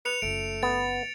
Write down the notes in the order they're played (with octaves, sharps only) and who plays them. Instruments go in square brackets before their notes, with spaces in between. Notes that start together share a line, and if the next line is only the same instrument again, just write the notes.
[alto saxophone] B4 [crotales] C#7 F7
[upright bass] F#1 F4 [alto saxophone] A3 [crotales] D7
[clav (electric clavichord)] B3 [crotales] A6